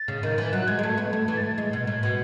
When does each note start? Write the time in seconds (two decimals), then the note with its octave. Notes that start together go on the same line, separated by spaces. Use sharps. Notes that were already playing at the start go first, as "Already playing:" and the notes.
Already playing: A6
0.08 C#3
0.23 D#3
0.38 E3
0.52 F#3 F#6
0.68 G#3 G#6
0.79 G#3
0.83 A3
0.98 B3
1.13 A3
1.28 E3
1.36 A6
1.43 G#6
1.58 G#3
1.73 B2
1.87 A2
2.03 B2